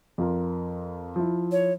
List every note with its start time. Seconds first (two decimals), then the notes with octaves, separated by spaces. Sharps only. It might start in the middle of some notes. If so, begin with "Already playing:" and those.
0.18 F2 F4 A#4
1.16 F3 E4
1.52 C#5